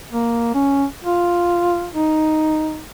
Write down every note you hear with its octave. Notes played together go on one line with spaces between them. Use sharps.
A#3
C#4
F4
D#4